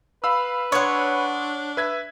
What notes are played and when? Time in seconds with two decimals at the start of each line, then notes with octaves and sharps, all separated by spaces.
0.24 B4 F5 B5 E6
0.72 D4 C#5 F#5 C6 C#6 D#6
1.77 B4 E5 G#6 B6